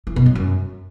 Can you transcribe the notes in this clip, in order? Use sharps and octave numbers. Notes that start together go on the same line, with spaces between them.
E3
B2
F#3
F#2